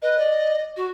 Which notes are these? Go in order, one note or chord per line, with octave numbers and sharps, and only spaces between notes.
B4 D#5
D5
F#4